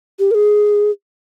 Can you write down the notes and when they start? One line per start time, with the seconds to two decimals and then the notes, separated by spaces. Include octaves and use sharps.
0.19 G4
0.31 A#4
0.35 G#4